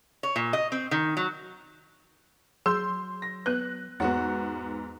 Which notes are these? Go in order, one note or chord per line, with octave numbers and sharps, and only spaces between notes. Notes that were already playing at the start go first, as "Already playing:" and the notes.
C#5
A#2
D#5
C4
D#3
F#3
F#3 G#4 C6 E6 G6
A#6
B3 B4 F#6
E2 G#2 B3 F#4 C#5 F#5